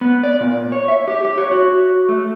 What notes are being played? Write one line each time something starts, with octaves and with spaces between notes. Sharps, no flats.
B3
D5
A#2
C#5
E5
G4
G4
C#5
F#4
A3